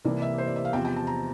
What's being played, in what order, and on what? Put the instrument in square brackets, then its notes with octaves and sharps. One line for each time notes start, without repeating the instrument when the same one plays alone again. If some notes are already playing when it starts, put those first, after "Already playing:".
[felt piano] C2 C3 E3 A#3 D5
E5
C5
D5
E5
F5
E2 C3 F3 C4 G5
G5
A5
A#5